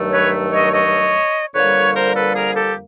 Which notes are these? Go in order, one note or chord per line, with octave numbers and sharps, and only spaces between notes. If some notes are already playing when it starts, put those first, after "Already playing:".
Already playing: G2 D#3 F#3 A3
B4 C#5
C#5 D#5
C#5 D#5
F2 D3 G3 A#3 B4 C#5
A#4 C5
A4 B4
G#4 A#4
G4 A4